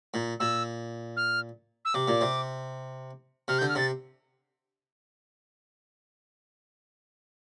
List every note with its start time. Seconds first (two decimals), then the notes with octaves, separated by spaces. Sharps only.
0.14 A#2
0.40 A#2 E6
1.17 F6
1.85 E6
1.94 C3 D6
2.08 A#2
2.21 C3
3.48 C3 F6
3.59 D3 G6
3.69 F6
3.75 C3 A6